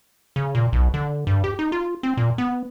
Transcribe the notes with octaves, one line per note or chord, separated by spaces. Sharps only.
C#3
A#2
B1
D3
G2
G4
D#4
F4
C4
A#2
B3